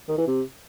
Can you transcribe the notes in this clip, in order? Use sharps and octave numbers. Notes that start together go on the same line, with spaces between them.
D#3
E3
C3